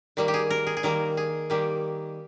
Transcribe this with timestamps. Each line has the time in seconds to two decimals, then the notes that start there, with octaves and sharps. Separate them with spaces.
0.17 D#3 G3 A#3
0.28 G4
0.34 G#4
0.50 A#4
0.67 G#4
0.77 G#4
0.83 D#3 G3 A#3 A#4
1.17 G#4
1.50 D#3 G3 A#3 G4